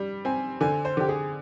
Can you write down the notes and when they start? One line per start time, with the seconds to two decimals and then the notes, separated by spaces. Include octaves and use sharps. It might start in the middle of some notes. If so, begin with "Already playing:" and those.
Already playing: G3
0.25 C4 G#5
0.61 D3 G#5
0.85 C5
0.97 D3 G4
1.09 G#4